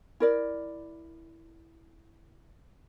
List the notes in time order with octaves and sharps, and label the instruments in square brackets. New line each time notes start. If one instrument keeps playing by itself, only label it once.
[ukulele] E4 A#4 D5